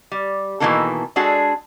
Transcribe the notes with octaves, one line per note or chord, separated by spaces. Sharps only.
G3
B2 D#3 E3 A#3 D#4 A4
G#3 D4 F#4 G#4 A4